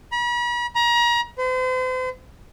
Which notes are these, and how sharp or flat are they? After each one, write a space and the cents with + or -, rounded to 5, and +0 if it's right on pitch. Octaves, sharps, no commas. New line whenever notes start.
B5 -45
A#5 +35
C5 -40